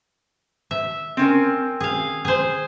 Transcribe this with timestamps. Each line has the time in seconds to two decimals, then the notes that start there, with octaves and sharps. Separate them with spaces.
0.71 E5
1.17 C4 C#4 A#4
1.80 G#4 F5
2.25 G#4 C5